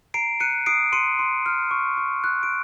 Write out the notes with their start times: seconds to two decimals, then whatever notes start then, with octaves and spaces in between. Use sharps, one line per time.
0.14 A#5 C7 D7
0.40 F#6 C#7 D#7
0.66 D#6 C7 D7
0.92 C6 C#7 D#7
1.19 C6
1.46 F6
1.71 C#6
1.97 C#6
2.24 F#6
2.43 D7